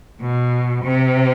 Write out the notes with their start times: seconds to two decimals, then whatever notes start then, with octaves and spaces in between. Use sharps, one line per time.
0.21 B2
0.84 C3